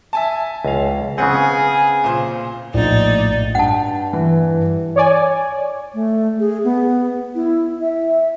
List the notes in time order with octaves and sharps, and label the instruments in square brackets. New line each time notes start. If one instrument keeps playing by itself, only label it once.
[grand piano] E5 G#5 A5
[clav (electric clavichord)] C#2 F5
[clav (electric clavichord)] C#3 B3 C4 [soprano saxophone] G#4 [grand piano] F#5
[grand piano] A#2 C5
[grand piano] A#1 [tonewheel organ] A2 [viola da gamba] D#4 [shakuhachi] D5
[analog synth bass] G2 [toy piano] F#5 A5
[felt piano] E3
[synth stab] C#5 D5 G#5
[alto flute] A3
G#4
B3
E4
E5